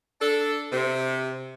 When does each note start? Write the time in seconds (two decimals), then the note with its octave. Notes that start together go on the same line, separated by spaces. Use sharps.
0.21 D4 A4
0.72 C3